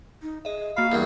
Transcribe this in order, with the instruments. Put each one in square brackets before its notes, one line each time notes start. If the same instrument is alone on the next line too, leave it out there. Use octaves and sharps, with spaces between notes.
[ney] D#4
[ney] G#4 [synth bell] D#5 E5
[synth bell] A#3 B5 [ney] F#4 [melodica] F5
[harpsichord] E2 G2 [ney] A#4